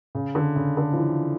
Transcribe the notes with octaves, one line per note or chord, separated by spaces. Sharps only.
C#3
D3
C#3
D3
F3
E3